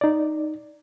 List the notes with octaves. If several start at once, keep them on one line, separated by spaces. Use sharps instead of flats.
D#4 D5